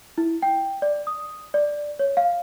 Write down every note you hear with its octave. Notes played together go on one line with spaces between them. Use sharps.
E4
G5
D5
D#6
D5
C#5
F5